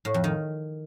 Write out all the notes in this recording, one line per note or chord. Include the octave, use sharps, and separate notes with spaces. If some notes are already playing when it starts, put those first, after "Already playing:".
A2
F2
D#3